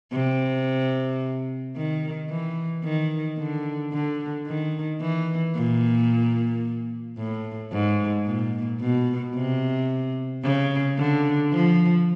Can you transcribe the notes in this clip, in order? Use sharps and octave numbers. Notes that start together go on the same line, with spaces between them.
C3
D#3
E3
D#3
D3
D3
D#3
E3
A#2
A2
G#2
A#2
B2
C3
C#3
D3
F3